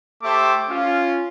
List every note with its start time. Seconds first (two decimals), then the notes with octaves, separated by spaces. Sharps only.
0.23 A3 G4 C5 E5 D6
0.69 C#4 F4